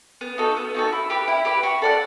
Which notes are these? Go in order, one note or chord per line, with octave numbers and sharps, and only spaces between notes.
B3
D#4 F#4 A4
B3
D#4 F#4 A4
E4
G4 B4
E4
G4 B4
F#4
A4 D5 F#5